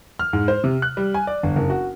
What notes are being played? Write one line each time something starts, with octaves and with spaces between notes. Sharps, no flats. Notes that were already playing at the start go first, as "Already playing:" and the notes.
F6
G#2
C5
C3
F#6
G3
G#5
D5
G1
F#1
F#4